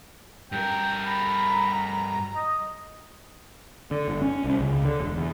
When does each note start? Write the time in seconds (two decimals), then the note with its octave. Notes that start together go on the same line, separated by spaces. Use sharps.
0.52 G2 A#4 G5
1.06 A#5 B5
2.36 D#5
3.91 D3
4.08 G1
4.22 C#4
4.44 C2
4.61 C#2
4.85 D3
5.00 E1
5.16 E2